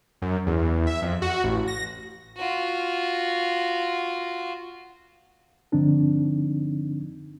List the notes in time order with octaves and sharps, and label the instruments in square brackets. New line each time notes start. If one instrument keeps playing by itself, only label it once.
[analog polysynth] F#2
E2
E5
F2
F#4
A1
A#6
[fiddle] F4 F#4
[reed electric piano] G2 D3 F3 C4 D4 D#4